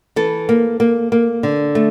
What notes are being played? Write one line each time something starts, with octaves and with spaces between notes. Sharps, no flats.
E3 A4
A#3
A#3
A#3
D3
A3